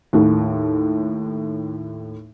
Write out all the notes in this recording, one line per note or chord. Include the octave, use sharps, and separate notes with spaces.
D#2 A2